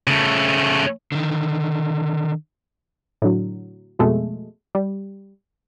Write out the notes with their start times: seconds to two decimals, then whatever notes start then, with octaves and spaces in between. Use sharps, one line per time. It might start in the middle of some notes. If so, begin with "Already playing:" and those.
0.07 C#3 A3
1.12 D3 D#3
3.22 A2 D3 F#3
3.99 F2 B2 G#3 A3
4.75 G3